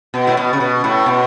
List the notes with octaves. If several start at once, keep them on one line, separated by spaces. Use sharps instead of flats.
B2
A2
B2
C#3
B2
A2
B2